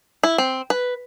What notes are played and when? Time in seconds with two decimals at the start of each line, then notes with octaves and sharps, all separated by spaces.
0.23 E4
0.38 C4
0.70 B4